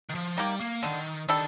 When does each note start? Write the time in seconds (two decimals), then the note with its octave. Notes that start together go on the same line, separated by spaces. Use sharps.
0.09 D#3
0.15 F3
0.37 D#3 G3 A#3
0.60 A#3
0.83 D3 D#3
1.28 D#3 G3 D4 A4